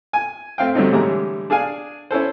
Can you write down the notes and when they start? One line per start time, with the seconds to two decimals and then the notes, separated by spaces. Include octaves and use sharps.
0.13 G#5
0.58 A3 C4 F5 G5
0.75 G2 D3 F#3 A3 C4 D#4
0.92 A2 D3 E3 G3 G#3 A#5
1.50 D4 G#4 F5 G#5
2.11 C#4 E4 A4 C5